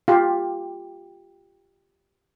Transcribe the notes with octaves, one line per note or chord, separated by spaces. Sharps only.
F4 G4